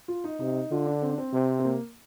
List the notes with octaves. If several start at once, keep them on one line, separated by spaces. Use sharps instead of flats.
F4
D#4
C3 D#4
D3 F4
D4
C4
D4
C4
C3
C4
A#3